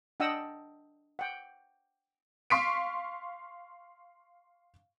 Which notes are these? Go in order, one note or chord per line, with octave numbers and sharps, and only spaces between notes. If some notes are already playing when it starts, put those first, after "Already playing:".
D4 D#5 F#5 G5 D#6 E6
F#5 G5
F5 C6 C#6 B6 C7 D7